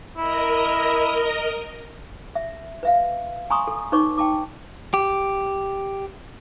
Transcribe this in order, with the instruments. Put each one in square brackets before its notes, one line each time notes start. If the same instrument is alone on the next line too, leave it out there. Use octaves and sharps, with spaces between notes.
[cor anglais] E4 [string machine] A#4 D#5
[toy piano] E5
B4 E5 F5
G#5 A#5 C6 C#6 D#6
A4
D#4 B4 C#5 C#6 D6
G5 A5 D6
[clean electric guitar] G4